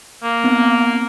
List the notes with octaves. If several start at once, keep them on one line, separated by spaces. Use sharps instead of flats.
A#3
B3 C4 D#4